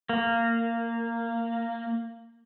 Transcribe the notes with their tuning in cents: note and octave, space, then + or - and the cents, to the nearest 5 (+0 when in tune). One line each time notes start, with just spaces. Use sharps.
A#3 -15